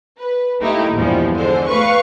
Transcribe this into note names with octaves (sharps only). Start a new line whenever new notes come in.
B4
A3 A#3 D#4 E4 G4
A#1 E2 G2 F3 G3 G#3
D3 G#3 C5
A3 B4 F5 C#6